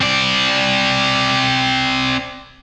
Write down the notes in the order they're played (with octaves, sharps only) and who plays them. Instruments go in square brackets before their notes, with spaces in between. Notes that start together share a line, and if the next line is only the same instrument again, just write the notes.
[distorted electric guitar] C4 D5